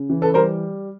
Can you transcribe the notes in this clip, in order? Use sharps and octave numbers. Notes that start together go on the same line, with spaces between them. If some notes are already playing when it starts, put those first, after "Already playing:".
Already playing: C#3
E3
A4 B4
G3 A#4 C5